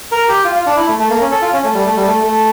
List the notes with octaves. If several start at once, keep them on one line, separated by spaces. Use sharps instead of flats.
A#4
G4
F4
F4
D4
E4
A3
A3
A#3
C#4
A4
F4
C#4
A3
G3
A3
G3
A3
A3